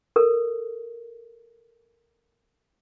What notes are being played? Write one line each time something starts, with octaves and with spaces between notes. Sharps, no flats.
A4 A#4